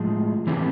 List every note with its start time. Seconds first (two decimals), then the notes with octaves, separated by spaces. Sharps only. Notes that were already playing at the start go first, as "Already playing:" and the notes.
Already playing: A2 F3 G#3
0.47 E3 A3 C4 E4 G4